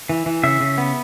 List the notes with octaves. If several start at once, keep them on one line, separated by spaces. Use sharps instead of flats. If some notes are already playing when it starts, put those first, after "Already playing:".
E3
E3
C#3 E5
C#3
B3